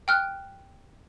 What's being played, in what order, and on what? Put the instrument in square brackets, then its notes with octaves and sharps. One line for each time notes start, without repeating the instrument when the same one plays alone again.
[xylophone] G5 F6 F#6